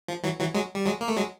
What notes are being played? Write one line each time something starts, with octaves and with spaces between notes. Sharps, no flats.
F3
E3 F#3
E3 F#3
F#3 G#3
G3
F#3 G#3
A#3
A3
F#3 G#3